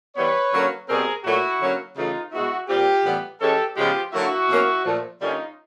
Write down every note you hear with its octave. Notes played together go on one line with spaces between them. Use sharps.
E3 G3 B3 B4 C#5
D3 F#3 A#3 C#4
B2 G3 C4 G#4 A#4
A#2 F#3 A3 E4 F#4
D3 F#3 A#3 C#4
C#3 E3 A3 D#4 F4
B2 G#3 B3 E4 F#4
A#2 G3 C4 F4 G4
A2 E3 G3 B3
E3 G#3 C#4 G4 A4
C#3 F3 G#3 B3 F4 G4
D3 F#3 A#3 E4 F#4
B2 F#3 A#3 C#4
A#2 F3 A3
D3 G3 A#3 C#4 D#4 F4